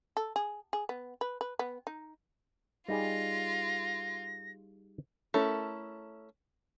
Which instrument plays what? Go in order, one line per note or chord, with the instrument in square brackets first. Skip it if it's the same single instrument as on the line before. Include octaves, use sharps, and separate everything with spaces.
[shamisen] A4
G#4
G#4
B3
B4
B4
B3
D#4
[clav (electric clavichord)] G3 D#4 G#4 [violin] F4 [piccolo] A#6
[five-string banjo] A3 C#4 E4 A4 A#4